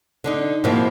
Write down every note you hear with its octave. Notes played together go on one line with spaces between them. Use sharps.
D3 D4 D#4
G#2 B2 F3 A#3 C4 E4